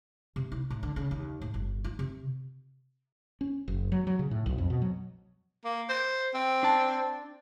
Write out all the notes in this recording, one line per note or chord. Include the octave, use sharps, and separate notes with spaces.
C3
E4
A2
D3
C#3
D#2
A2
G1
F4
C3
C#4
F#1
F#3
F#3
C#3
A2
B1
F2
B2
F#3
A#3
C5
C4
D4 A5